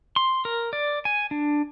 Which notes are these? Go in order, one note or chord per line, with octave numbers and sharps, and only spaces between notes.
C6
A#4
D5
G#5
D4